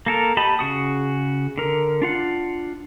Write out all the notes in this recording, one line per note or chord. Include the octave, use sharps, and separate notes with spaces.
A#3 A4 A#4
G4 D#5 A5 B5
C#3 F#4 D#6
D3 A#4
D4 F4 F#5